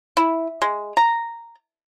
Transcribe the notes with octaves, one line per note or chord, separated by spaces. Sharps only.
E4
G#3
A#5